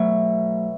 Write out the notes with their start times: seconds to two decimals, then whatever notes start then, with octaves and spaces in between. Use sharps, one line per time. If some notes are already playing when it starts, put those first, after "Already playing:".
Already playing: B2 F#3 A3 C#5 E5